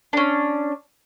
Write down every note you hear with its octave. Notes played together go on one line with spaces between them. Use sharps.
C#4 D4